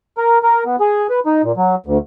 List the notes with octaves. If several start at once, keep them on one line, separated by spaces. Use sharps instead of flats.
A#4
A#4
B3
G#4
B4
D#4
A#2
F#3
D2